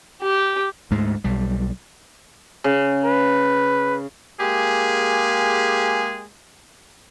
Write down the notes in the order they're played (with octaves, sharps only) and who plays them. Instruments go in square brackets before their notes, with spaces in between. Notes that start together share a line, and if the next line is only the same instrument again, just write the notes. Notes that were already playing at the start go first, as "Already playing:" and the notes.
[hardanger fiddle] G4
[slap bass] D2 G#2 G#3 A3
B1 G3
[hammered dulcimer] C#3
[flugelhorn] B4
[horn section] G#3 A#3 G4 G#4